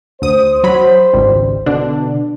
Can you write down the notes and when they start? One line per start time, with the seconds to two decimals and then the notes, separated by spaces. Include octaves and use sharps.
0.22 D2 C5 D#6
0.63 F#3 B5
1.13 G#1 C#2 G3
1.66 B2 D3 D4